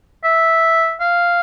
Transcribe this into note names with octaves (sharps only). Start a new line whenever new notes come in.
E5
F5